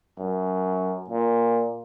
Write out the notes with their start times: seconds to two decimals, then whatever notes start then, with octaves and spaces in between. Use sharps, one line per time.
0.19 F#2
1.10 A#2